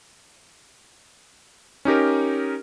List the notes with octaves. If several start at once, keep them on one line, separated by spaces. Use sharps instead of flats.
C#4 D#4 G4 A#4